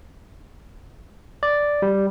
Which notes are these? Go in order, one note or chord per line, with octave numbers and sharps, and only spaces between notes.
D5
G3